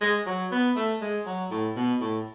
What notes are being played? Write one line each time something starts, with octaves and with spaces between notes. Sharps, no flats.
G#3
F#3
B3
A3
G#3
F#3
A2
B2
A2